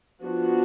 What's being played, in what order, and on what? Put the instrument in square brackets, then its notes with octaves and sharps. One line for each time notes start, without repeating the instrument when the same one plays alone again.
[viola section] F3 B3 D4 F#4